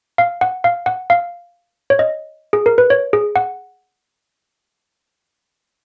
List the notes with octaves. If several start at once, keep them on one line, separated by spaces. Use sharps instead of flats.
F5
F#5
F5
F#5
F5
C#5
D#5
G#4
A#4
B4
C#5
G#4
F#5